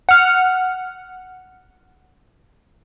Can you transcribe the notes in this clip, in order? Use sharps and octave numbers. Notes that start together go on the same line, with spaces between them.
F#5 F6